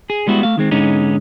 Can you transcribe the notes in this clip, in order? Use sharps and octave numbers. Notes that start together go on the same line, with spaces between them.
G#4
G3 G#3 B3 E4 F#4
A3 F5
D#3 G#3 C4
G#2 D3 G#3 B3 C#4 D#4